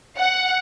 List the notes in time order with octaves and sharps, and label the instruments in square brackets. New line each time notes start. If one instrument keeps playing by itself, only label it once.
[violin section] F#5